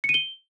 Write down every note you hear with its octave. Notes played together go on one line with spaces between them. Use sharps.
C#7
D#7
G7